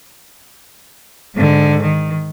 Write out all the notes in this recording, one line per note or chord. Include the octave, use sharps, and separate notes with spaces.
G#2 D3
D#3